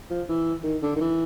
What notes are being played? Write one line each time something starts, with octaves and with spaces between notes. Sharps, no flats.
F3
E3
D#3
D3
D#3
E3